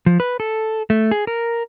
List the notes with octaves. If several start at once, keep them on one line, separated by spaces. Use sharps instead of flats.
F3
B4
A4
A3
G#4
A#4